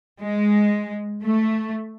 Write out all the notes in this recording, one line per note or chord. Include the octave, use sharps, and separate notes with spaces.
G#3
A3